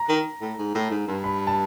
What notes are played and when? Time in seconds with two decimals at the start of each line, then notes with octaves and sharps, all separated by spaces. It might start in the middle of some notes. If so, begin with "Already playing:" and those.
Already playing: A#5
0.09 D#3
0.41 A2
0.58 G#2
0.75 A2
0.91 G#2
1.08 G2
1.24 B5
1.47 A5